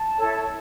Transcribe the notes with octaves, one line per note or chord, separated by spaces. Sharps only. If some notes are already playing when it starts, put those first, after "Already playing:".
Already playing: A5
E4 A4 C#5